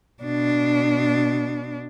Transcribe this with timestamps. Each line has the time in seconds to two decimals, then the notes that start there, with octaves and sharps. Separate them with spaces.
0.23 B2 D4